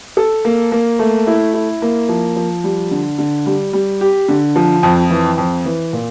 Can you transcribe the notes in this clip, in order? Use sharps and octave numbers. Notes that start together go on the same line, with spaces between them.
A4
A#3
A#3
A3
E4
E4
A#3
F3
F3
G3
D3
D3
G3
G3
G4
D3
F3
F2
E3
F2
E3
A#2